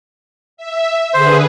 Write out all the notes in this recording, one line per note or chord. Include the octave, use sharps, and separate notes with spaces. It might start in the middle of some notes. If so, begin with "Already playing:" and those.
E5
D3 G#4 B4 C5